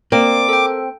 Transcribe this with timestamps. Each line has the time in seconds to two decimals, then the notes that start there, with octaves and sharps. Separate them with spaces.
0.12 A#3 C4 D5 D6
0.49 A4 G5